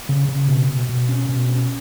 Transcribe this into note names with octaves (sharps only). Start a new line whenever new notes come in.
C#3
C#3
B2
B2
B2
C#4
B2
C#4